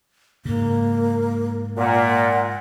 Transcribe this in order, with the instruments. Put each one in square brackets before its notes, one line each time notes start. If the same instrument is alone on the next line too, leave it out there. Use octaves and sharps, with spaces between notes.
[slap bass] G#2 C#3 [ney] A#3
[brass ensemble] A#2 [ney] F#5